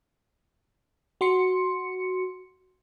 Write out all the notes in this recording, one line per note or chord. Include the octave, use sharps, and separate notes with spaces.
F#4 C6 C#7